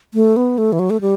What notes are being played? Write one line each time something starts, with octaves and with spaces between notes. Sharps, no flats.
A3
B3
A3
E3
F#3
A3
G3